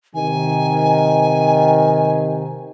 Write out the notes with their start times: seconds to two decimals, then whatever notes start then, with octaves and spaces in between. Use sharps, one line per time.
0.15 C3 D#3 G#5